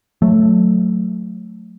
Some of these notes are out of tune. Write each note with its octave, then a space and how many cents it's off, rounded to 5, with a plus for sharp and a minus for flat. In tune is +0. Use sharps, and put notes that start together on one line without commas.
F#3 -15 A3 +0